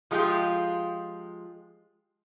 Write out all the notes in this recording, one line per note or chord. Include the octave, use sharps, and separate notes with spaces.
F3 G#3 F4 G4